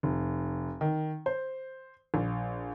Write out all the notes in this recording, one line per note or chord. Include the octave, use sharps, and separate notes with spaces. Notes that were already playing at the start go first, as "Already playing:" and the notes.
F1
D#3
C5
A#1